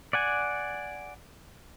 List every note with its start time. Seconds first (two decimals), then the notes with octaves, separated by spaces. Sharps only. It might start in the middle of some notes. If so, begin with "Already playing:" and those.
0.13 D5 F#5 G#5